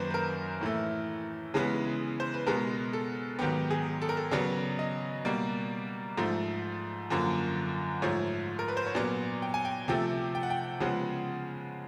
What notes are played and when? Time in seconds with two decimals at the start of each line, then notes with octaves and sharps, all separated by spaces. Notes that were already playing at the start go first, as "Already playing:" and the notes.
Already playing: F#2 D#3 F#3 A#3 B4 C5
0.10 B4
0.14 A#4
0.61 A2 E3 A3
1.54 C#3 E3 G#3 B3
2.20 C5
2.34 B4
2.46 B2 G#3 B3 A#4
2.93 A4
3.39 G#2 D#3 F#3 B3 G4
3.70 G#4
4.02 A4
4.09 A#4
4.17 A4
4.31 C#3 F#3 B3 D5
4.79 D#5
5.25 B2 G3 A#3 D5
6.18 G#2 F3 A3
7.10 F#2 D3 F3 A#3
8.02 G#2 F3 A3 C#5
8.59 A#4
8.68 B4
8.77 C5
8.87 C#5
8.95 A#2 F#3 B3 D5
9.42 G5
9.54 G#5
9.65 G5
9.88 C3 F3 A3 G5
10.35 G5
10.43 F#5
10.50 G5
10.80 C#3 F3 G#3 B3 F#5